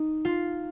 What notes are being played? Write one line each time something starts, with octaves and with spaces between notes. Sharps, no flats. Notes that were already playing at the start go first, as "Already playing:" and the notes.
Already playing: D#4
F4